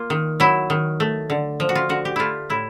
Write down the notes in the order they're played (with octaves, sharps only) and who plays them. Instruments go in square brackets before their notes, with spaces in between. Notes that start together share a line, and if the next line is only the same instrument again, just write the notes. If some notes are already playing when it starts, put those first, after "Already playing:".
Already playing: [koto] A#3 F4
D#3
F#3 E4
D#3
A3
D3
F3
F#4
F4
D3 F#4
G4
A3 E4 F4
A2 E4